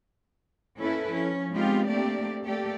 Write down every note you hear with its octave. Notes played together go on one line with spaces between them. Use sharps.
A#3 C#4 E4 A4 B4
F3 C#4
G#3 B3 C4 D#4 F4 G4
A3 A#3 C4 D4 G4 D5
A3 A#3 G4 A4 D5